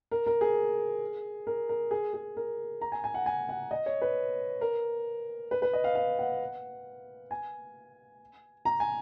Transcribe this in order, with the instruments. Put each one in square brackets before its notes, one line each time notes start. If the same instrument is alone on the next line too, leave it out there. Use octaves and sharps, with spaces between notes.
[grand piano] A#4
A#4
G#4
A#4
A#4
G#4
G#4
A#4
A#5
G#5
G#5
F#5
G#5
F#5
D#5
C#5
B4
A#4
B4
B4
D#5
F5
F5
F#5
G#5
A#5
G#5